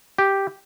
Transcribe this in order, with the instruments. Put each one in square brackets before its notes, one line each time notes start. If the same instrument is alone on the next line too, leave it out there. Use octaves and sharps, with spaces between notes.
[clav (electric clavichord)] G4